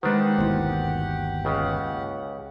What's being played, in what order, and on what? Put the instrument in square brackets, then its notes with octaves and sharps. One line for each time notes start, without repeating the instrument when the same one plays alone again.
[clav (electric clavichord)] D#3 D4 D#4 [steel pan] G#3 B4 C5 [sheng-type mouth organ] G4 F#5
[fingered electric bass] G1 D#2 B2 [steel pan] E4 C5
[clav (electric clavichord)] C#2 C#3